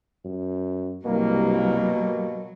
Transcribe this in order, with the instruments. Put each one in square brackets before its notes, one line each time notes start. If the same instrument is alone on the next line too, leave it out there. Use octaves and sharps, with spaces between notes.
[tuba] F#2
[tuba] C2 [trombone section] G2 A#3 [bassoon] B2 [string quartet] F#3